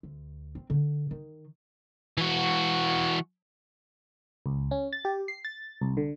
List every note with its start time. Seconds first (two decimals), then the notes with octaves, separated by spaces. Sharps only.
0.03 D2
0.55 C4
0.70 D3
1.11 D#3
2.18 E3 F#4
4.46 C#2
4.71 C#4
4.93 A6
5.05 G4
5.28 C7
5.45 A6
5.81 C2
5.97 D3